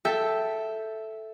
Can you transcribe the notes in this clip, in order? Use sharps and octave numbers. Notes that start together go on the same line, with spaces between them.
A4 E5 G5